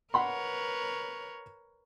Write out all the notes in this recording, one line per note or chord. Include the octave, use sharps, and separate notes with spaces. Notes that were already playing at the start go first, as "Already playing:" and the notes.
A#4 B4 C#5 F#5 B5 C6